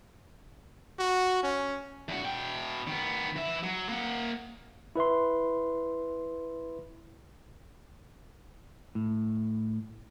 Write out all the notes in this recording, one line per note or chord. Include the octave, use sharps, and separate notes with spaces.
F#4
C#4
E2 F#4
B2 G5
D#3 B3
E3 E5
F#3
A#3 F#5
E4 B4 E5 C6
A2